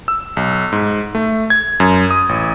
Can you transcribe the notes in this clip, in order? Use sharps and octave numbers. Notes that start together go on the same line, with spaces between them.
E6
B1
G#2
A3
G#6
F#2
D#6
A1